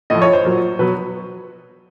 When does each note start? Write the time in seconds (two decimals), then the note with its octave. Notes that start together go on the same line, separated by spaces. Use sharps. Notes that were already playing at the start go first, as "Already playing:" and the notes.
0.10 A2 F3 D#5
0.22 C#5
0.33 C5
0.45 A#2 F#3
0.79 B2 F#3 B4